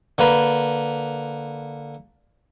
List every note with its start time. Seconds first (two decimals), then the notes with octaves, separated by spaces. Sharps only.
0.18 D3 A#3 B4